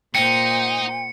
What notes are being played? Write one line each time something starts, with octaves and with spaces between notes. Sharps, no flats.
A#2 D#4 C5 G5 C#7